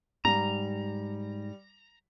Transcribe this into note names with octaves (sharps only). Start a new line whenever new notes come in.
G#2 G3 A#5